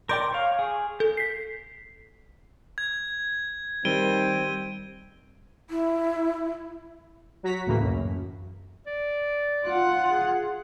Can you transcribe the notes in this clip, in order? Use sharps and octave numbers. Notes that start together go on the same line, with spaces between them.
A#4 D5 G5 C6 G6 D7
C#5 F5
G#4
A4 G6
B6 C7
G#6
D#3 G3 C4 D7 D#7 G7
E4
F#3 F#4 A#5 B6
D2 A2 C#3 E3 A#3
F#2
D5
F4 F#5
G#4